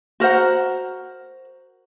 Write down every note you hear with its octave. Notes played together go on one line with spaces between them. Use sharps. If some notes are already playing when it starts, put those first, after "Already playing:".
F#4 A#4 C5 F#5